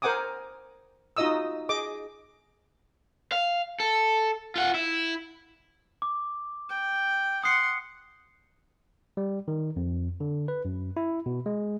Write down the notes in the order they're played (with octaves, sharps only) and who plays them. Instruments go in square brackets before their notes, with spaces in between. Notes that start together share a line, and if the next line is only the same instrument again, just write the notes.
[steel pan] A#4 C5 F#5 G#5 D6 D#6
D#4 F4 F#4 D#5 D#6 E6
G#4 D#5 D6
[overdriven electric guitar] F5
A4
F4 F#5
E4
[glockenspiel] D6
[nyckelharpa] G5
[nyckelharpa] F#5 C6 [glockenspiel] D#6 C7 C#7
[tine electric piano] G3
D#3
F2
D3
B4
F#2
E4
B2
G#3